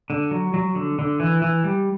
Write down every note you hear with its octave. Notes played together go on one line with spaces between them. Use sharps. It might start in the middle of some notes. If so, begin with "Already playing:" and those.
D3
F#3
F#3
D3
D3
E3
E3
G3